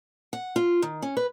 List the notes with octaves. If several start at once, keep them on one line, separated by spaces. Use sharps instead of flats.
F#5
F4
D#3
C#4
B4